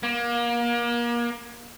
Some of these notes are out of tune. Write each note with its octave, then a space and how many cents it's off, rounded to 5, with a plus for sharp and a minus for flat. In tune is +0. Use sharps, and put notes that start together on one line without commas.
A#3 +30